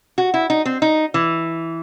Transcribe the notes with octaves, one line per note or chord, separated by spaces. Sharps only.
F#4
E4
D#4
C4
D#4
E3